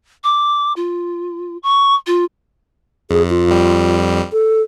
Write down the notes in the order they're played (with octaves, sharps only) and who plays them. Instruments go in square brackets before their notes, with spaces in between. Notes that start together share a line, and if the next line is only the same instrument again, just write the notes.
[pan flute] D6
F4
C#6
F4
[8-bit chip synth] F2 [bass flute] G#4
[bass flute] F4
[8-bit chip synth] F2 G3
[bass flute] A4